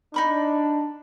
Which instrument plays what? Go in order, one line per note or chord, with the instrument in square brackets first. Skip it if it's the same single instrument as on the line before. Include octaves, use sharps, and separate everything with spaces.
[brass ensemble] D4 [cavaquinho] D#4 B5 C#6